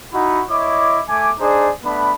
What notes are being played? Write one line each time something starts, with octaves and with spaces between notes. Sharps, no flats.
D#4 E4 F#4 F#5 B5
E4 C#5 D#5 D6
A3 G#5 D6
D4 D#4 G#4 C5 D5
A3 B3 D4 B5